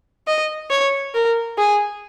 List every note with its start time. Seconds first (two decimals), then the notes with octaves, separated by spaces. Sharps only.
0.27 D#5
0.70 C#5
1.14 A#4
1.58 G#4